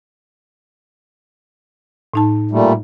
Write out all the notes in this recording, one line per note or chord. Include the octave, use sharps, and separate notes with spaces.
A2 D#4 A5
A#2 G3 A3